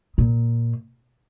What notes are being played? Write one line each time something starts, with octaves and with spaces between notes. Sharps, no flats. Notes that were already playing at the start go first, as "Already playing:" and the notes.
A#2